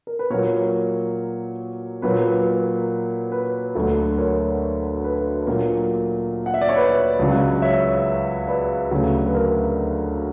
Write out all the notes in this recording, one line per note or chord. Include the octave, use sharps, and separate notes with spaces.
A#4
B4
A#2 F#3 A#4 C#5
A#2 F#3 B4
B4
A#4
B4
D2 D3 F#3
A#4 C#5
B4
A#2 F#3 A#4
F#5
E5
D5
C#5
B4
C#2 C#3 F#3
C#5 E5
B4 D5
D2 C#3 F#3
B4
A#4